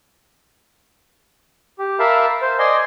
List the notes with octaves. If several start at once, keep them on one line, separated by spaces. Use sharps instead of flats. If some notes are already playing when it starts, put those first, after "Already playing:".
G4
A#4 E5 F5 A5 B5
C5
D5 D#5 G#5 C6